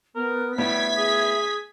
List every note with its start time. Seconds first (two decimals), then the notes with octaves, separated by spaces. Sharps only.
0.15 B3 A#4
0.58 A2 G3 B3 E5 G#6 B6
0.97 G#4